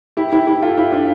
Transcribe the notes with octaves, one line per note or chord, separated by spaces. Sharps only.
E4 G4
E4 G4
E4 G4
F4 A4
E4 G4
D4 F4